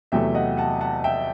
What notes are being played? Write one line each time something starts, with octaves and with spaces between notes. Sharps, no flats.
E2 C3 F#3 A3 E5 G5
D#5 F#5
F#5 A5
F#5 A5
E5 G5